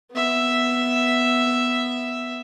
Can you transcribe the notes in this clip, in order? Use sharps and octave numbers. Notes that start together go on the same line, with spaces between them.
B3 E5